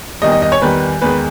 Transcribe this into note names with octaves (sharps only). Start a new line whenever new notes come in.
E2 D#3 G3 D#5
D#5
D#5
C#5
E2 D#3 G3 B4
E2 D#3 G#3 B4